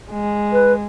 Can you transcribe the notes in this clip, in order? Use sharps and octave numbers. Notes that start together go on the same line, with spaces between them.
G#3
B4